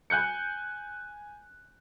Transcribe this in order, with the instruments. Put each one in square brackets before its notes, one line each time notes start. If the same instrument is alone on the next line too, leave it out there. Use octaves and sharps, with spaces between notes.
[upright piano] G#5 F#6 G6 C#7